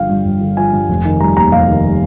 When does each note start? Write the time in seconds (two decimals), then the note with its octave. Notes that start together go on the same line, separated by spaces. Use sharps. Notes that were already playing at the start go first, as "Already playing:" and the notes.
Already playing: G1 D3 F3 F5 G5
0.09 G2
0.25 G1
0.41 D3
0.57 F3 G#5
0.73 G2
0.89 F1
1.05 D#3
1.20 G3 A#5
1.37 D#2 A#5
1.52 F1 F5
1.68 D#3
1.84 G3